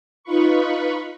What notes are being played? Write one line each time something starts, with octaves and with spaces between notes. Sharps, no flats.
D#4 F4 B4 B5 C#6